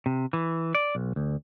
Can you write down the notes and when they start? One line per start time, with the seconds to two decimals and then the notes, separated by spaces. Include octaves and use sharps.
0.06 C3
0.33 E3
0.75 D5
0.95 B1
1.16 D2